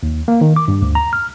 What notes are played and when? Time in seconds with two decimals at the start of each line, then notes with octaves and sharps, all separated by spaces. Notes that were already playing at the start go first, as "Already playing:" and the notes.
0.03 D#2
0.28 A#3
0.41 D#3
0.56 D6
0.68 G2
0.82 D2
0.95 A#5
1.13 F6